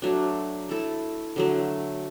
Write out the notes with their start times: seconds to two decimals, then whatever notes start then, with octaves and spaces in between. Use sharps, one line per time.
0.02 F#3 A3 D4
0.69 A3 E4 A4
1.36 D3 F#3 A3